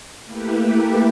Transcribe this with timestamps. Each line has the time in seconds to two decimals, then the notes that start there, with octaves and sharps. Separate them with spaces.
0.24 A3 A#3 E4 G4 B4